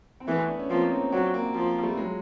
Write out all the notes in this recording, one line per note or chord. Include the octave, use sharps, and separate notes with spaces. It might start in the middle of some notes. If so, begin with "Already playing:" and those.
C4
E3 A3 B3
D4
C#4
F3 A#3 C4
C#4 D#4
F#3 C4 D4
A#3 C4
F3
G3 A3
F#3 G#3